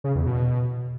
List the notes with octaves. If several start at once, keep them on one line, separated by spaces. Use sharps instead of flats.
C#3
E2
B2